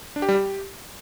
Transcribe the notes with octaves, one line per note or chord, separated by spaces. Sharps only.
D4
G4
G3
G4